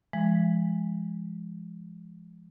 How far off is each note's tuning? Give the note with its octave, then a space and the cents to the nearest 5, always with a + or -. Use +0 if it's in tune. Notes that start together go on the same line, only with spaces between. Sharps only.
F3 -35 G#3 +0